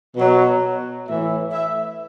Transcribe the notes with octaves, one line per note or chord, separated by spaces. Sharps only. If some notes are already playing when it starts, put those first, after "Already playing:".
B2 F#3
A2 E3 E5
E5